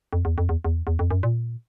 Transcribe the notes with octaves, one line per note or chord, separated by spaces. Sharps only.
F2
E2
F2
E2
E2
E2
F2
F#2
A#2